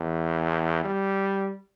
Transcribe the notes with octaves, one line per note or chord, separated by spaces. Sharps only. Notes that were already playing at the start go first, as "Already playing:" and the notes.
Already playing: E2
G3